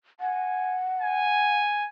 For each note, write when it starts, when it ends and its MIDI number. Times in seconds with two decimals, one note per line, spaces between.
0.20 1.60 78
0.20 0.79 80
1.01 1.86 80